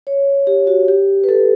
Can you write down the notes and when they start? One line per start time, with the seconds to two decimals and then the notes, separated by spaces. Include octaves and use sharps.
0.07 C#5
0.47 G4
0.67 F#4
0.88 G4
1.24 B4
1.29 A4